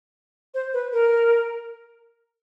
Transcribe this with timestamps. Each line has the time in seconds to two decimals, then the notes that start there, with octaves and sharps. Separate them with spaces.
0.54 C5
0.73 B4
0.93 A#4